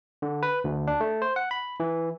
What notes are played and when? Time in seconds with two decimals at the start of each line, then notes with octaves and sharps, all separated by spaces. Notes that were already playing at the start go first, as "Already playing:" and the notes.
0.22 D3
0.43 B4
0.64 D2
0.87 D4
1.00 A3
1.22 C5
1.36 F#5
1.51 B5
1.80 E3